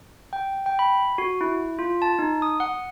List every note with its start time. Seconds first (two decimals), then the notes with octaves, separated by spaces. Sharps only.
0.33 G5
0.66 G5
0.79 B5
1.18 F#4
1.41 E4
1.79 F4
2.02 A5
2.19 D#4
2.42 D#6
2.60 F#5